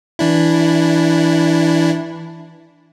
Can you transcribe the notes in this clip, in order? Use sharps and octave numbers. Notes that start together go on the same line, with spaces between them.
E3 D4 E4